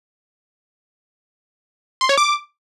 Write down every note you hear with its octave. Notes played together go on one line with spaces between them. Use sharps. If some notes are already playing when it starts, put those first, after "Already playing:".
C6
C#5
D6